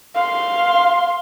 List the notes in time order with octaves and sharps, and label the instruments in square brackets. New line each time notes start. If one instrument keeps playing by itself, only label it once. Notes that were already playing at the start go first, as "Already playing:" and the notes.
[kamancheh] F5 C6